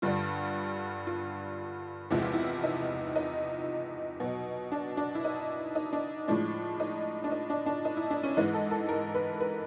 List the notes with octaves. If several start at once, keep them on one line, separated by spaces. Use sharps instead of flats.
G2 D3 G3 F4
F4
E2 C3 F3 G#3 E4
F4
E4
D#4
D#4
B2 F#3
D4
D4
E4
D#4
D#4
D4
A2 F3 G#3 D4
D#4
D4
D#4
D4
D4
D#4
E4
D4
C#4
G#2 E3 G#3 D#4
A4
A4
A#4
B4
B4